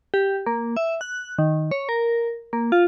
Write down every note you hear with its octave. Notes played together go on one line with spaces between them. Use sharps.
G4
A#3
E5
F#6
D#3
C#5
A#4
A#3
F4